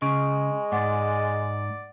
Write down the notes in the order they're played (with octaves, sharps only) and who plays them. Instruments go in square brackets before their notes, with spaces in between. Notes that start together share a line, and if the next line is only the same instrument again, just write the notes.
[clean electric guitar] C#3 [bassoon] G#3 [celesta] C#6 D7
[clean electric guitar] G#2 [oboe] D5 [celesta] F#5 A6